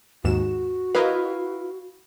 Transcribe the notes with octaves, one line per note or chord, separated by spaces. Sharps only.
D#2 G#2 F#4 E7
E4 F4 A#4 B4 D#5 F5